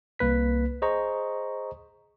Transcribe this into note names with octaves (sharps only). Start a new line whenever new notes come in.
C2 A#3 B4 B6
G#4 C5 D#5 A#5 C#6